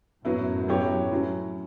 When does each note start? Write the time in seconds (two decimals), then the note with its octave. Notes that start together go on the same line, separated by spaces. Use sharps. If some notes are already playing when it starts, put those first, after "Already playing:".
0.25 F#2 A2 F#3 B3 E4
0.68 F#3 B3 E4 G4 C#5
1.11 A2 F#3 C#4